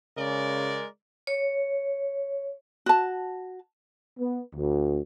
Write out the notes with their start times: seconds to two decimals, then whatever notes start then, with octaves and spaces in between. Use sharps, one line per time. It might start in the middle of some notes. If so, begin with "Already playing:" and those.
0.18 C#3 G#3 A#4 D5
1.27 C#5
2.86 F#4 A5
4.19 B3
4.55 D2